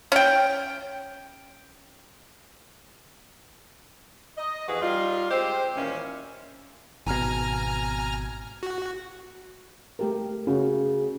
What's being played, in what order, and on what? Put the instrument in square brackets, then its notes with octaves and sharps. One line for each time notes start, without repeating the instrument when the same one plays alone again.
[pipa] C#4 G5
[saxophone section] D#5
F2 E3 F#4 G#4 B4
G3 D#4 F4
G#3 C4 G4 C5
A#2 D#3 E3 C#4
[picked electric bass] G#1 B2 [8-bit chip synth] G#5 A#5 F6
[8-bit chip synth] F#4
[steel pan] A3 G4 A#4
[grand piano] C#3 [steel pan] C#4 F#4